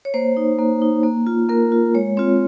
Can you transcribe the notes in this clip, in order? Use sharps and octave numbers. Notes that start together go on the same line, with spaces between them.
C#5
A#3 C5
D#4
A#3
D#4
A#3
F4
A#3 A#4
F4
G#3 C#5
C4 F4 C#5